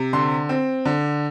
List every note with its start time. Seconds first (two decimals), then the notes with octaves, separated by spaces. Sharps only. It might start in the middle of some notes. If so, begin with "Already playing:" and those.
Already playing: C3
0.13 D3 C6
0.49 C4
0.85 D3